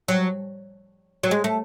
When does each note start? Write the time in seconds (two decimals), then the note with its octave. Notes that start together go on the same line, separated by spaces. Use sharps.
0.08 F#3
1.23 F#3
1.31 G#3
1.44 A3